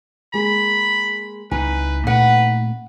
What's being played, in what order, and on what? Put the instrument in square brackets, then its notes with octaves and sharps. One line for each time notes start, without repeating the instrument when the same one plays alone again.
[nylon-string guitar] G#3 A#3 G#4 [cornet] B5
[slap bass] C#2 C4 [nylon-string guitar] D#4 E4 G#5 [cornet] B4
[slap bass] A#2 A3 C4 [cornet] B4 [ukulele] F#5